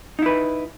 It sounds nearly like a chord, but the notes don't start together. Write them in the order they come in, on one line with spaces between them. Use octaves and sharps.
D#4 E4 B4